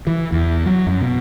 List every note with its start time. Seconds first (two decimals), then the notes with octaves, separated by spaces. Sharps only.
0.07 E3
0.32 E2
0.66 F#3
0.87 F#2
1.01 B2